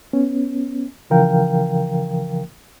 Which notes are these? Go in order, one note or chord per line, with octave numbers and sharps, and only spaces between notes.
B3 C#4
C#3 E3 F3 A#4 F5 G5